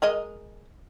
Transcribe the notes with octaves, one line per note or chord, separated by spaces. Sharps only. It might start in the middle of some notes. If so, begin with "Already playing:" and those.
G#3 A#4 D#5